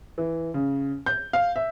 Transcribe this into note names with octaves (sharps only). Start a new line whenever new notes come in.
E3
C#3
G6
F5
E5